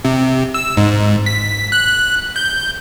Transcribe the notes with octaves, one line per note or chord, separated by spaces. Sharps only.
C3
E6
G#2
B6
F#6
G6